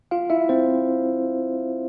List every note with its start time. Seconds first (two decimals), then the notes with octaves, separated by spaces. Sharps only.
0.11 F4 F5
0.30 E4 E5
0.49 C4 C5